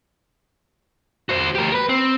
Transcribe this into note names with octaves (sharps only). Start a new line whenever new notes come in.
F#4 C5
G4 A#4
A#4 B4
C4